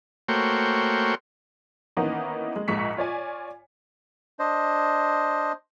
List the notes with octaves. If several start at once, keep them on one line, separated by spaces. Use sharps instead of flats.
A3 A#3 F#4 C5 C#5 G5
D#3 E3 A#3 B3 C#4 D#4
G#3
A#1 G#2 G#3 C#6 B6 C#7
F4 C#5 D5 G#5
D4 C5 D#5